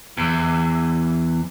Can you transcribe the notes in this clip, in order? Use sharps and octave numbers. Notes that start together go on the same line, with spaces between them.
E2